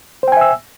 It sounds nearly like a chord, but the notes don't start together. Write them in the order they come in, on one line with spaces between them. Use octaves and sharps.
C5 G5 G#5 E5 E6